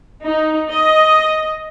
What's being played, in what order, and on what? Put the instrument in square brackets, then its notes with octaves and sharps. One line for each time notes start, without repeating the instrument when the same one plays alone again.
[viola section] D#4
D#5